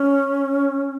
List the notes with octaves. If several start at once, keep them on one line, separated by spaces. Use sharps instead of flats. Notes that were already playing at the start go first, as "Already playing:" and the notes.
Already playing: C#4